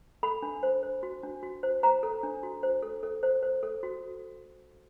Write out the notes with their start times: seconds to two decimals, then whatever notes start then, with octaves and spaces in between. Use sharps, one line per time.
0.23 A4 B5
0.42 D4
0.63 C5
0.83 C5
1.03 F#4
1.23 D4
1.43 F#4
1.63 C5
1.83 C5 A#5
2.03 A4
2.23 D4
2.43 F#4
2.63 C5
2.83 A4
3.03 A4
3.23 C5
3.43 C5
3.63 A4
3.83 F#4